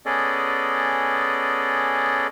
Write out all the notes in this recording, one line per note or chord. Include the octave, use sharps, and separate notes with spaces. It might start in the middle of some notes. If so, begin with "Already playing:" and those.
B3 C#4 G#4 A4 D5 D#5